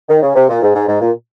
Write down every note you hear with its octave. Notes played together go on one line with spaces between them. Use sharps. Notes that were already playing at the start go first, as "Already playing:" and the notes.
D#3
C#3
C3
A#2
G#2
G#2
G#2
A#2